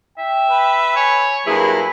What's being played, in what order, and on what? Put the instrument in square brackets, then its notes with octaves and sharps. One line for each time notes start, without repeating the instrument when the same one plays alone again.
[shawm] E5 [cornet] G5
[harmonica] B4
[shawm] C#5 [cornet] G#5
[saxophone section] G2 E4 G#4 [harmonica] F#3 A#3 [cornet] B4 [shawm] B5